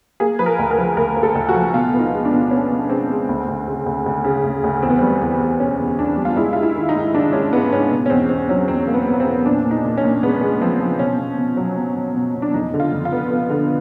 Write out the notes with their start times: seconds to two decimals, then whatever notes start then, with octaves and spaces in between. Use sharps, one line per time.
0.20 A#3 G#4
0.39 F3 B4
0.46 A#4
0.59 D2
0.71 A#4
0.78 F3
0.97 D2 A#4
1.17 A#3
1.23 A4
1.35 D2
1.49 F#4
1.54 F3
1.74 B2 F4
1.94 B3
1.99 D#4
2.13 G#3
2.25 D4
2.33 B2
2.51 B3 C#4
2.71 B2
2.89 G#3 C4
3.10 G#3
3.29 D2
3.48 D2
3.68 C#3
3.86 D2
4.06 D2
4.24 C#3
4.44 D2
4.64 D2
4.82 E2 C4
4.90 B3
4.98 G3 C4
5.21 E2
5.40 E2
5.60 B2 C#4
5.79 E2
5.98 E2 D4
6.17 G3
6.25 F4
6.36 G#3 E4
6.53 G#3 F4
6.63 E4
6.75 D#3
6.89 D#4
6.95 G#2
7.13 D#3 D4
7.33 G#3 C#4
7.52 G#2 B3
7.72 G#2 C#4
7.92 B2
8.06 C#4
8.10 E2 C4
8.29 B2 C4
8.49 F#3 C#4
8.68 E2 C4
8.88 A#3
8.94 B3
9.07 B2
9.14 B3
9.20 C4
9.26 E2
9.45 A#2 D4
9.65 A#2
9.71 D#4
9.84 A#2
9.97 C#4
10.04 A#2
10.23 G#3 B3
10.41 G#3
10.61 F3 C4
10.80 F3
10.99 B2 C#4
11.19 B2
11.38 B2
11.57 F#3
11.76 B2
11.96 B2
12.16 B2
12.35 B2
12.42 D4
12.54 F2 D#4
12.74 D3
12.80 F4
12.92 F2
13.05 F4
13.12 B3
13.31 B3
13.50 D3